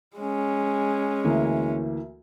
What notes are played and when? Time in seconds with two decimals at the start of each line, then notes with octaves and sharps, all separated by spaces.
0.16 G#3 C#4
1.25 D2 E3 A#3